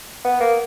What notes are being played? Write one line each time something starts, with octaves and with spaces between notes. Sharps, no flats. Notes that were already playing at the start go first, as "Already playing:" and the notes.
B3
A#3